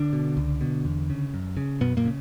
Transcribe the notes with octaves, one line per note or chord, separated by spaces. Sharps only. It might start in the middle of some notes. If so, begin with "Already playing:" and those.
Already playing: D3 D4
B2
C#2
B2
E2
C#3
F#2
C#3
F#2 B2 B3
A#2 A#3
C#3